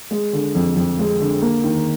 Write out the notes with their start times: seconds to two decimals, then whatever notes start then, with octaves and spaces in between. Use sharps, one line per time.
0.11 G#3
0.33 D3
0.55 F2
0.77 F2
0.99 G#3
1.20 D3
1.42 A#3
1.64 D#3